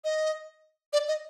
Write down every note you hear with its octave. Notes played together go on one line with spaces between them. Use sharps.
D#5
D5
D#5